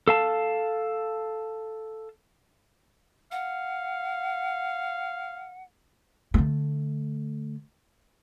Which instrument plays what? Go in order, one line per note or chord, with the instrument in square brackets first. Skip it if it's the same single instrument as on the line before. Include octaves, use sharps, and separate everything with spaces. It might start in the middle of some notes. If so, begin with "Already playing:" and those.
[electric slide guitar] A4 F5 A5
[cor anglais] F5 [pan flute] F#5
[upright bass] D3 A3